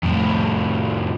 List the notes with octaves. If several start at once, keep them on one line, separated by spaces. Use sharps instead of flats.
F2 A2